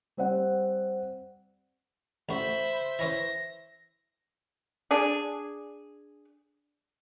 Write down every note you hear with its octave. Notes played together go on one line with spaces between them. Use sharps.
G3 C4 D5 F#5
A1 F#4 C5 E5 B5
E3 C#4 E4 A#6
D4 G#4